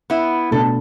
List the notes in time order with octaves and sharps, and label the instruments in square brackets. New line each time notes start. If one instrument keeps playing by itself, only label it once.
[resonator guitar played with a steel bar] B3 E4
[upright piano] B2 A3 D4 [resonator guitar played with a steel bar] A4